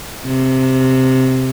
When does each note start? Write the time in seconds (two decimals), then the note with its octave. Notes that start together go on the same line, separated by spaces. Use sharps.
0.25 C3